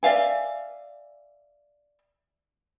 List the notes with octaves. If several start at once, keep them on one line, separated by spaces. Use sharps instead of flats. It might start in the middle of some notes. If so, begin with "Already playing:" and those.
D5 E5 F5 G#5